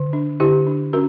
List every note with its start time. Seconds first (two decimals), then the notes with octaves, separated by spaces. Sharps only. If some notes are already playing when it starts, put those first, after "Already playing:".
Already playing: D3
0.13 D4
0.40 D3 E4 G4
0.67 D4
0.93 C#4 F#4 A#4